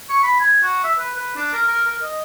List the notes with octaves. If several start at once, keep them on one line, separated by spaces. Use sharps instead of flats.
C#6
B5
G#5
F#4
E5
B4
B4
D4
A#4
A#4
A#4
D#5